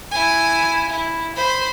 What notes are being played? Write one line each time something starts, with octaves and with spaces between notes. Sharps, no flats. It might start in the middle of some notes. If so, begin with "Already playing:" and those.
E4 G#5
E4
C5 B5